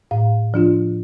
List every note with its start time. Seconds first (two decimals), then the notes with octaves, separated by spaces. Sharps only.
0.11 A2 F5
0.54 F3 D4 F4